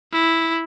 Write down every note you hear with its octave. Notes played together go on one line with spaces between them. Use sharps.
E4